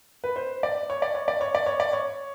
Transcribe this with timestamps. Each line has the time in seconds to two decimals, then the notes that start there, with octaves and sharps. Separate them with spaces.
0.24 B4
0.36 C5
0.63 D5
0.90 C#5
1.02 D5
1.15 C#5
1.28 D5
1.41 C#5
1.55 D5
1.66 C#5
1.80 D5
1.93 C#5